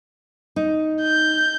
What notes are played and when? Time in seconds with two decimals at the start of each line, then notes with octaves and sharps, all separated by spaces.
0.56 D#4
1.02 G6